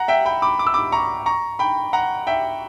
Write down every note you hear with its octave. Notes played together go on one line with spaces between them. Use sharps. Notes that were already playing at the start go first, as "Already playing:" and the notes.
Already playing: F#5 A#5
E5 G5
G5 B5
B5 D6
D6
E6
B5 D6
A#5 C#6
A#5 C#6
G5 B5
F#5 A#5
E5 G5